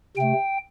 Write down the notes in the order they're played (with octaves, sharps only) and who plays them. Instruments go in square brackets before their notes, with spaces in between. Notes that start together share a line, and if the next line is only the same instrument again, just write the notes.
[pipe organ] C3 A3 G5